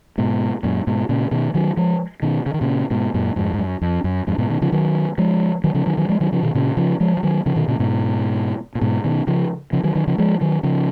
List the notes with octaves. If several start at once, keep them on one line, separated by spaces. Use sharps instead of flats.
G#2 B2
F#2 A#2
G#2 B2
A#2 C#3
B2 D#3
D#3 F#3
F3 G#3
B2 D#3
C#3
D#3
A#2 C#3
G#2 B2
F#2 A#2
F2 G#2
G#2
F#2
F2
F#2
F2 G#2
G#2 B2
B2 D#3
C#3 F3
D#3 F#3
F3 G#3
D#3 F#3
C#3 F3
D#3 F#3
D#3 F#3
F3 G#3
D#3 F#3
C#3 F3
B2 D#3
A#2 C#3
C#3 F3
F3 G#3
F3
D#3 F#3
C#3 F3
B2 D#3
A#2 C#3
G#2 B2
A#2
G#2 B2
B2 D#3
C#3 F3
C#3 F3
D#3 F#3
D#3 F#3
C#3 F3
F3 G#3
D#3 F#3
C#3 F3